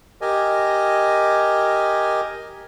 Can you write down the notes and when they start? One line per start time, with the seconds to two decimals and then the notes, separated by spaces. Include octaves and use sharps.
0.21 G4 A#4 D#5 G#5